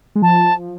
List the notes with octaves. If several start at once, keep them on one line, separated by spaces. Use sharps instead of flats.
G#3
F3 A5